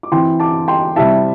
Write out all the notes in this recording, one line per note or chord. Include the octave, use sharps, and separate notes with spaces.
D6
E3 C4 E4 G5 C6
A5 D6
G5 C6
C3 G3 E4 E5 A5